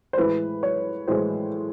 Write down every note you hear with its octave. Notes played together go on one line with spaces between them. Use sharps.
C5
A2 E3 G#3 B4
C#5
A2 E3 G#3 C5